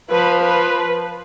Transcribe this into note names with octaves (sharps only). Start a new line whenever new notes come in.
F3 B4
B4